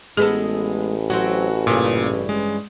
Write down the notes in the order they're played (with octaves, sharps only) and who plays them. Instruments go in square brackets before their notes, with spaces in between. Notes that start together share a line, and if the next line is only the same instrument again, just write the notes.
[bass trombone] A1 [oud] G#3 B3 A4 [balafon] G#4
[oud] F#3 C4 [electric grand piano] F#4
[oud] G2 C#3 E3 [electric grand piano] A#2
[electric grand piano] G#3